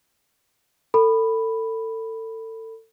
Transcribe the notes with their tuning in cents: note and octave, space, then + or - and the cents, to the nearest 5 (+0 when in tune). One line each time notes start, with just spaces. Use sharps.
A4 +30 B5 +0